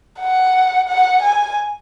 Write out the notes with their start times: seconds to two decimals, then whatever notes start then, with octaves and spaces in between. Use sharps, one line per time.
0.20 F#5
0.89 F#5
1.23 G#5